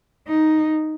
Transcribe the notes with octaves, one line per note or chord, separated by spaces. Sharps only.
D#4